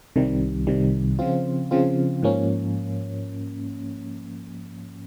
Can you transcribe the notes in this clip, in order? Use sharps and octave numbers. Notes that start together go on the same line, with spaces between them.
C2 C3 D#3 G3
C2 C3 D#3 G3
C#3 F3 C4 F4
C#3 F3 C4 F4
G#2 F3 A#3 C#4